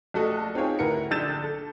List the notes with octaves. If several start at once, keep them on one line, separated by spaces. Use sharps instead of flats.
A#1 A3 F#4 A4 D#5
C4 D#4 F4 G#4 C#5 G5
D2 E4 A#4 B4 F#5 C#7
A#1 D3 E6 G6 A6 E7
A4